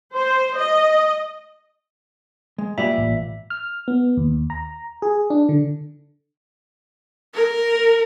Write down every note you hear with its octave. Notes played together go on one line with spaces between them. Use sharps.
C5
D#5
G#3
A#2 G3 B4 D5 E5
A1
F6
B3
D#2
A#5
G#4
D4
D3
A#4